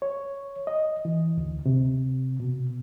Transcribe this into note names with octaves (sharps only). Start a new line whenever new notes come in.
C#5
D#5
E3
D2
C3
B2